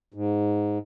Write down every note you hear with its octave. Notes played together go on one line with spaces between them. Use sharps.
G#2